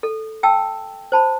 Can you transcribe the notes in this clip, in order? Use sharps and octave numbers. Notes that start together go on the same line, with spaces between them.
A4
G5 A5 E6
C5 A5 B5